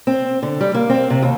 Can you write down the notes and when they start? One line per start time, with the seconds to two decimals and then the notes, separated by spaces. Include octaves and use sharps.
0.07 C4
0.43 D3
0.61 G3
0.74 A#3
0.90 C4
1.10 C3
1.22 D#2